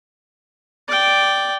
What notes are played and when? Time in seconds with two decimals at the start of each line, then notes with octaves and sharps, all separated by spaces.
0.88 D5 G5